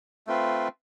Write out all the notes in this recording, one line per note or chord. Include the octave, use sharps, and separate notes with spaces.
A3 C4 F4 B4